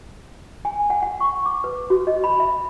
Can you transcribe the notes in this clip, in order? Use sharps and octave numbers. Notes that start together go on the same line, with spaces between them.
G#5
F#5
F#5
C#6
D6
B4
F#4
D#5
B5
E5